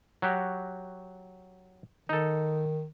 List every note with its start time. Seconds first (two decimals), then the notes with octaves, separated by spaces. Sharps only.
0.22 F#3 F#4 G4
2.09 D#3 D#4 A4